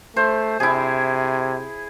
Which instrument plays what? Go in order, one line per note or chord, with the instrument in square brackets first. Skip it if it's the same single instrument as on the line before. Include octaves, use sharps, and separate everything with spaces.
[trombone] A3 [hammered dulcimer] C5
[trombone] C3 [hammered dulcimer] E4 G#4